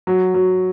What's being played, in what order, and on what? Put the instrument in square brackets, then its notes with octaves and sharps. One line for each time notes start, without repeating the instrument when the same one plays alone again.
[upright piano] F#3
F#3